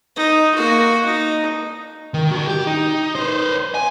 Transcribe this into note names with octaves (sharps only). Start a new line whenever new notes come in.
D#4
A#3 F#4
D#4
D#3
D3 F#4
G4
D#4
B4 C5
G#5